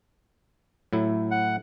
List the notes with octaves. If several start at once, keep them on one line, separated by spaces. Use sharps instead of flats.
A2 F#3 E4
F#5